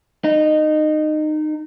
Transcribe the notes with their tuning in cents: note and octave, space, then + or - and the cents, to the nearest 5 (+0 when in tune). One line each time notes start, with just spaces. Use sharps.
D#4 -20